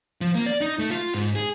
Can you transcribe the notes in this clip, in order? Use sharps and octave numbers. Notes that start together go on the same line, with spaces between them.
F3
A#3
D5
D#4
A3
F4
G#2
G#4